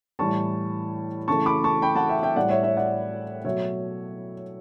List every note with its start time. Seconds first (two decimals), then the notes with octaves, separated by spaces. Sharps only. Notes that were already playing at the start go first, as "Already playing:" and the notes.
0.19 A2 E3 G3 A5 C#6
1.28 C#3 E3 A3 A5 C#6
1.46 B5 D6
1.64 A5 C#6
1.82 G5 B5
1.95 F#5 A5
2.09 E5 G5
2.23 E5 G5
2.36 A2 G3 D5 F#5
2.50 C#5 E5
2.63 C#5 E5
2.77 D5 F#5
3.45 B2 F#3 A3 C#5 E5